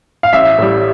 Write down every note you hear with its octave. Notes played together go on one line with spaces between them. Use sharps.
F5
A1 E5
A2 G3